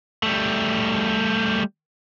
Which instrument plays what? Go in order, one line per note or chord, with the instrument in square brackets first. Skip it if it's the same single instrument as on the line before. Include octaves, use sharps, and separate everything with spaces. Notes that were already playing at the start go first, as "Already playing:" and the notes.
[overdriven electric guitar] G3 A3